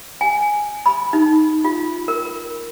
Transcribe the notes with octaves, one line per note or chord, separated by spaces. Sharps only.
G#5
B5
D#4
F4
A#4